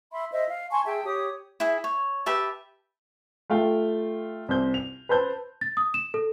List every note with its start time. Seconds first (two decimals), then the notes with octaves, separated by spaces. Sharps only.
0.11 E5 B5 C6
0.32 C5 D#5 E5
0.48 F5
0.71 G#5 A5 C6 C#6
0.86 G#4 E5 G5 A5
1.05 G4 C#5 D#6
1.60 E4 G#4
1.84 C#5
2.26 G4 B4 E5 A5
3.50 A3 F4 F5 G5
4.49 C2 C5 G6
4.74 F7
5.09 B4 C5 A5 G6
5.61 A6
5.77 D#6
5.94 E7
6.14 A4